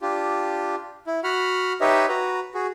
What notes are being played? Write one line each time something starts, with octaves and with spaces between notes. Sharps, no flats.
D4 F4 G4
E4
F#4 F#5 B5 F6
D#4 G4 B4 C#5 D#5 E5
F#4 B4 A#5
F#4 G#4